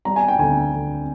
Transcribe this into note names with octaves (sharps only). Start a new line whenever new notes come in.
G3 A#5
G#5
G5
D2 G#5
D2